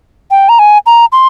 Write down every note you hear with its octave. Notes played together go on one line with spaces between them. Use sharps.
G5
A#5
G#5
A#5
C6